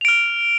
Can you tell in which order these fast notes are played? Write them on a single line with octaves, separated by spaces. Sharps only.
F7 D7 F6